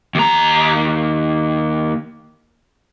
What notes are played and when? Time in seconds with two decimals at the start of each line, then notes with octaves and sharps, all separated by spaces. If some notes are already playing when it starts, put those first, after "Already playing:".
0.15 D#2 A#5